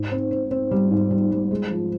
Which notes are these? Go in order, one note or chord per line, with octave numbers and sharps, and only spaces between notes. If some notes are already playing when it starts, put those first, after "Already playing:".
Already playing: G#2
C4
C4
C4
G3
G#2
G3
G3
G#3
F3